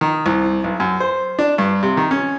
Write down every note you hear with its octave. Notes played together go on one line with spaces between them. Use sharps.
D#3
C2
B1
F#2
C5
D4
G2
C3
D#3
C#4